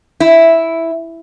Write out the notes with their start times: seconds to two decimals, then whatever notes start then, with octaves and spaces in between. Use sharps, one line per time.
0.20 E4